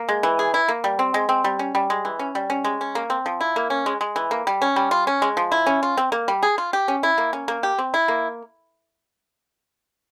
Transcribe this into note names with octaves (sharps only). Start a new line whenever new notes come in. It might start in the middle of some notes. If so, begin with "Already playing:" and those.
Already playing: A#3
G#3
E3
G#4
E4
A#3
G3
C4
G#3
C4
G3
C#4
G3
G#3
E3
C#4
G3
C#4
G#3
C#4
A#3
C4
F3
E4
A#3
C#4
G#3
G#3
E3
A#3
G3
C#4
G3
F4
C#4
G#3
F3
E4
C#4
F4
C4
A#3
G3
G#4
F4
G4
C#4
E4
A#3
C#4
A#3
G4
C4
E4
A#3